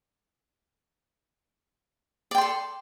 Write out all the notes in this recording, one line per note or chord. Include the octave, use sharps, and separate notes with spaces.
A4 D5 G5 C6